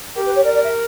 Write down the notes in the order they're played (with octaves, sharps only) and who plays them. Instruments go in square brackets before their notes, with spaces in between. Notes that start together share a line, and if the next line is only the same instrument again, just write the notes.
[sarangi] G4 [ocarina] A#4
[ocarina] B4
C#5
[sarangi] A#4 [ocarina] D5
[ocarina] D5
E5